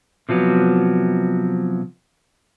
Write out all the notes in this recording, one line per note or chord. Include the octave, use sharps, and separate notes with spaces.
C3 F3 F#3 B3